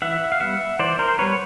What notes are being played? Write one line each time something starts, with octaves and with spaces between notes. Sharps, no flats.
E3 E5 F#5
F5
G3 B3 E5 F#5
E3 C5 D5
A#4 C5
G3 B3 B4 C#5